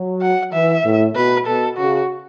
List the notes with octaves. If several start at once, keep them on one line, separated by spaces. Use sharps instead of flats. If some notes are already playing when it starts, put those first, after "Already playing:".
Already playing: F#3
F#5
E3 E5
A2
B2 B4
B2 A4
C#3 F#4